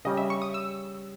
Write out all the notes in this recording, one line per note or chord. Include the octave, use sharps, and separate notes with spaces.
C#3 G3 C#4 G4 D#5
E5
C#6
D#6
E6